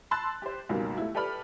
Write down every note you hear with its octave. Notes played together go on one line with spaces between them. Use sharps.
A5 B5 C6 E6 F#6 A6
G4 C5
C#2 F#2 B2 D#3 G3 A#3
A3 E4
G4 A4 B4 D5 B5 F6